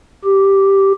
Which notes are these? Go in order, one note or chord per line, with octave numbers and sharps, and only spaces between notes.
G4